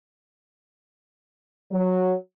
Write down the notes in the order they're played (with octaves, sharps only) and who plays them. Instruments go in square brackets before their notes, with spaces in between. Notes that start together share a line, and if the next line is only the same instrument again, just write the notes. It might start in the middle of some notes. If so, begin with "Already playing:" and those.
[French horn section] F#3